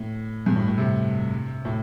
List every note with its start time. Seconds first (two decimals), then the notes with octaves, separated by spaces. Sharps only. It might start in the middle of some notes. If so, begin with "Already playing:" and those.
Already playing: A2
0.46 G2
0.56 A2
0.67 A2
0.78 C3
1.65 A2